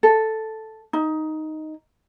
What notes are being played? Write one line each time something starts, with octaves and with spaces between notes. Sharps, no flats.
A4
D#4